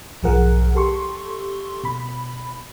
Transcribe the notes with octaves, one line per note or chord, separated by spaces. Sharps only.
B1 G#2 F3 G#4 A#4 F#5
G4 A4 C6 C#6
B2 B5